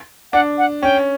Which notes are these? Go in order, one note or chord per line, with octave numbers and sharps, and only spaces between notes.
D4 F#5
F#5
C#4 G5